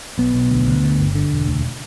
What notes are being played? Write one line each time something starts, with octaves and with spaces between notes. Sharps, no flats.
B1 B3
B1
D2
D2
D3
G1
D3
E1
D2